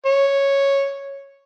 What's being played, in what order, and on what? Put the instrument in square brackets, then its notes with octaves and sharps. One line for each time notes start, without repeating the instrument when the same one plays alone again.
[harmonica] C#5